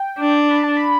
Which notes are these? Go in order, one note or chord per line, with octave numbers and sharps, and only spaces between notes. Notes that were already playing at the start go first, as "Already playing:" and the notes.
Already playing: G5
D4
B5
A5
B5